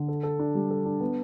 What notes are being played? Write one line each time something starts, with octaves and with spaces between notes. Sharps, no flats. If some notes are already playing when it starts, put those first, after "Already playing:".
Already playing: D3
A4
A4
D4
G3
A4
D4
B3